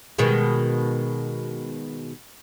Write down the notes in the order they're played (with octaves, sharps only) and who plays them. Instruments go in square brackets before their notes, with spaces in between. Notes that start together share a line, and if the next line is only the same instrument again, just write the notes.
[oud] B2 D#3 G#3